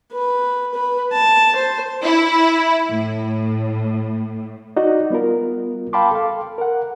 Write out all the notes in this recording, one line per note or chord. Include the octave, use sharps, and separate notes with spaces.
B4
B4
A5
C5
E4
A2
D#4 F#4 D5 D#5
G3 B3 F4 A#4
F5 G5 A5 B5 C6 D6
A4 F5
A#4 F#5